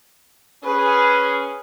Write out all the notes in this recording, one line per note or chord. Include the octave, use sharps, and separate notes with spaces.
C#4 G#4 B4